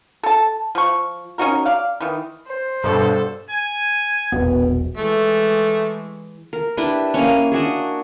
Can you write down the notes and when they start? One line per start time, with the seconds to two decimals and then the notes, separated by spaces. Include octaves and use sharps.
0.23 A4 A5
0.75 F3 C#6
1.38 C#4 D#4 F#4 A#4
1.66 D5 F5
2.01 D#3 E3
2.48 C5
2.84 G2 B2 A4
3.49 G#5
4.32 E1 A#1 B2 B3
4.97 E3 G#3 A3
6.53 A#4
6.77 D4 E4 G4 B4
7.14 A#3 C#4
7.52 D4 F#4 G#4